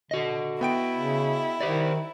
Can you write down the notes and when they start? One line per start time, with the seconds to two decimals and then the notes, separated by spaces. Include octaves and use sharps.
0.11 D3 F#4 D#5
0.61 B3 E4 G5 D7
0.96 C#3
1.61 D#3 G4 C5 D5